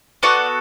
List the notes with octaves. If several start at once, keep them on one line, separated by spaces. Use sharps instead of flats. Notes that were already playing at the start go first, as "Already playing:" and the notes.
B3 F#4 A4 D5 F#5